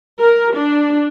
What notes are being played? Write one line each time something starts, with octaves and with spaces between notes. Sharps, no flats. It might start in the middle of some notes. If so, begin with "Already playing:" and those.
A#4
D4